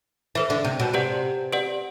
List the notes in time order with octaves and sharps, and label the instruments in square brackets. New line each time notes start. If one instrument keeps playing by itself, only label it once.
[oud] E3 [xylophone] A4 C5 E5
[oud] D3
C3
B2
[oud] C3 [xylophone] G4 B4 D5 F#5
[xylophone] G4 B4 D5 F#5